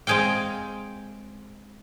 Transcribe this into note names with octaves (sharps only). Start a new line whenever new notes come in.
G#3 C4 G#4 F5 G5